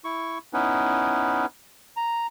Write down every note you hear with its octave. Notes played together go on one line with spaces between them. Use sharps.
E4 C#6
B3 C#4 D#4 E4 B4
A#5